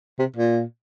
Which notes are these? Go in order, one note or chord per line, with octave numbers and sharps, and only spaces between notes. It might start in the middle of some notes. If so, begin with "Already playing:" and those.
C3
A#2